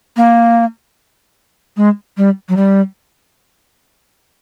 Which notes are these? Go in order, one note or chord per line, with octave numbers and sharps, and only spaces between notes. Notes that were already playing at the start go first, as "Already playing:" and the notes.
A#3
G#3
G3
F#3
G3